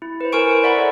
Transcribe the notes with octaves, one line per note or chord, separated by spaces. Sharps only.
E4
B4 C5
E4 A#4 C5 G#5 C#6 D7
C5
D5 E5 F#5 A#5 B5 C#6
A4 C#5